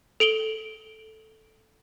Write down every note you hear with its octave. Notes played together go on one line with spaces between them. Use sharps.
A4 D7 F#7 G7